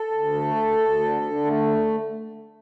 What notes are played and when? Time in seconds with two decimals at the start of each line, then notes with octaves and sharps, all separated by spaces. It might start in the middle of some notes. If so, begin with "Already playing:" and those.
Already playing: A4
0.11 D2
0.33 A3
0.55 D2
0.78 D2
1.00 D3
1.22 D3
1.45 A3